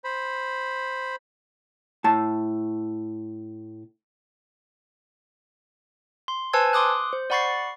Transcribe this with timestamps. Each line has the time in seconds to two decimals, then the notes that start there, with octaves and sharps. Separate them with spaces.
0.04 C5 B5
2.04 A2 A5
6.28 C6
6.53 B4 C5 G#5 A5 E6 G#6
6.73 C6 D6 D#6 F#6
7.13 C5
7.30 D5 F#5 B5 C#6 A6 C7